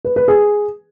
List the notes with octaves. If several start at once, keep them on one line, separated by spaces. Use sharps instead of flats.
B4
B4
G#4